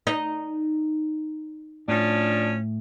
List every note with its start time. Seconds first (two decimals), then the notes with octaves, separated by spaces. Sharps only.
0.07 D#4
1.88 A2 F3 C#4 D4